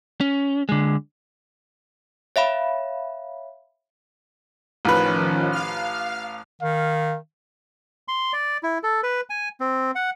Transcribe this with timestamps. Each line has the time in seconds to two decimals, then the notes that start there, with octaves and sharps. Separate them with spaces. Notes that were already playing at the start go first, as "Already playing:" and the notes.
0.21 C#4
0.69 D3 G#3
2.36 C#5 E5 F5 B5
4.85 A1 D#3 F3 C#4 B4
5.52 F5 F6
6.62 D#3 F5
8.08 C6
8.33 D5
8.63 E4
8.83 A4
9.03 B4
9.30 G#5
9.60 C4
9.95 F#5